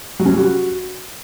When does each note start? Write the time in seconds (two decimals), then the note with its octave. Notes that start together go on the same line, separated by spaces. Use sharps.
0.19 F#3
0.25 C#4
0.32 G3
0.38 F#4